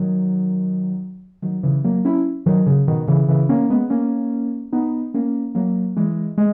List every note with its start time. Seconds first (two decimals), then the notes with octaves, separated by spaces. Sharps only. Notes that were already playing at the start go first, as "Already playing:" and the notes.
Already playing: D#3 F#3
1.42 D#3 F#3
1.63 C#3 E3
1.84 F#3 A#3
2.05 C#4 E4
2.46 D#3 F#3
2.67 C#3
2.88 B2 D#3
3.08 C#3 E3
3.29 C#3 E3
3.49 A#3 C#4
3.70 G#3 B3
3.90 A#3 C#4
4.73 B3 D#4
5.14 A#3 C#4
5.55 F#3 A#3
5.96 E3 G#3
6.38 G#3